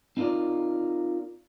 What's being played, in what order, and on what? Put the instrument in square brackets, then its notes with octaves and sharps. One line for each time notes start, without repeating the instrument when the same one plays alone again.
[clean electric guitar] C4 D#4 F4 A#4 D5